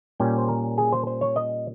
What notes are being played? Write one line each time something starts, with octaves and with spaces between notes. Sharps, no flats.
A#2 G3 C#4 G5
C5
A#4
G#4
C5
C5
C#5
D#5